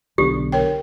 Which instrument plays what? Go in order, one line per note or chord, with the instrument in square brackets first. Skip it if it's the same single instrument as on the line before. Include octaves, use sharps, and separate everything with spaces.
[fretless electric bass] B1 B2 D3 [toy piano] G4
[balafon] A#4 C#5 G5